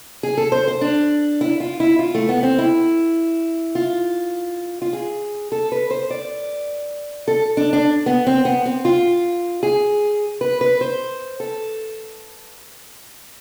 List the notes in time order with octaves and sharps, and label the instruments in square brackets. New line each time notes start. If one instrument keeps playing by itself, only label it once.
[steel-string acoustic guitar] G#4
A4
C5
C5
D4
E4
F4
E4
F4
A3
B3
C4
E4
F4
F4
G#4
A4
B4
C5
D5
A4
D4
D4
B3
C4
B3
C4
F4
G#4
B4
B4
C5
A4